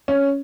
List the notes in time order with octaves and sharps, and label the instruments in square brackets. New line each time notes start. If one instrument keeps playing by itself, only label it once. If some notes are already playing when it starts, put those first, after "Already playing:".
[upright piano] C#4